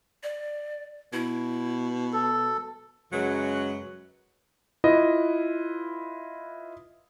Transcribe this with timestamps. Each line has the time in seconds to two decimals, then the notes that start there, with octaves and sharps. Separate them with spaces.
0.23 D5
1.13 B2 E4
2.13 A4
3.12 F#2 C#3 F#3 G#3 F#4 B4
4.84 E4 F4 B4 D#5